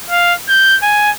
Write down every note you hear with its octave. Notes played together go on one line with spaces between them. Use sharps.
F5
G6
G#5